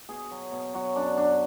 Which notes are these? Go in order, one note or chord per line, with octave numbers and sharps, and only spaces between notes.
B2 G#4
F#3
B2
F#3 F#4
F#2 D4
F#2 D4